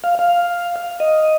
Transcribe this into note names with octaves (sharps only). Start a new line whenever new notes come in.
F5
F5
D#5